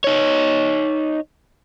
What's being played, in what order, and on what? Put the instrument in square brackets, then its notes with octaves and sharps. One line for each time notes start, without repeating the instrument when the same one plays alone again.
[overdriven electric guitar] D#4 C#5